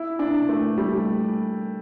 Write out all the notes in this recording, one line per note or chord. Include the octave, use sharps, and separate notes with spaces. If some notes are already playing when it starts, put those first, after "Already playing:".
Already playing: E4
D4
A3
G3